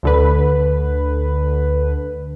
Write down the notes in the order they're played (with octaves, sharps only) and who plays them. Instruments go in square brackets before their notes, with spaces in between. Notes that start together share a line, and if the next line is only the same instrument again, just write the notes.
[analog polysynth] D2 D3 B4